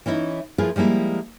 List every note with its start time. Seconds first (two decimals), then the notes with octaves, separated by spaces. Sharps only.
0.06 E3 C#4 D#4 E4
0.58 F3 E4 F4 G#4 A#4 B4
0.76 F3 G3 G#3 A#3 E4